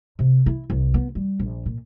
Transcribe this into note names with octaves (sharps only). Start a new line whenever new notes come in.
C3
E4
C2
B3
G3
A#1
A#2